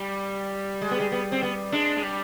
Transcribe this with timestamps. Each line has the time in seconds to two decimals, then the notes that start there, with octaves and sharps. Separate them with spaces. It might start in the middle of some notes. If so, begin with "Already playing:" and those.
Already playing: G3
0.82 G#3
0.91 B3
1.00 G#3
1.12 B3
1.32 C4
1.43 B3
1.72 G#3 D4
1.97 G#3
2.03 G3